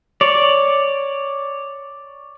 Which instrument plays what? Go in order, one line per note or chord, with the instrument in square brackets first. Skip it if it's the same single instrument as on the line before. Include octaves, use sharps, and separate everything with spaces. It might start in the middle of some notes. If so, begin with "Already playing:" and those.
[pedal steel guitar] C#5 D5